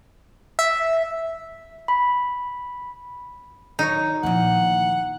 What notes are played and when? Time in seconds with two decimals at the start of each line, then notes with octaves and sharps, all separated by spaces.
0.59 E5
1.88 B5
3.79 D#3 F#3 D#4 C#5
4.23 E2 A#2 D#3 F3 F#5